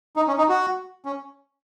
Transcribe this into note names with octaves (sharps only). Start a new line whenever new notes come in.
D#4
C#4
D#4
F#4
C#4